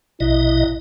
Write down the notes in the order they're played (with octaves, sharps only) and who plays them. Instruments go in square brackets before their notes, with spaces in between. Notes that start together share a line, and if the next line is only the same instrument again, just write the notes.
[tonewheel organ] A#1 B2 D#5 [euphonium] E4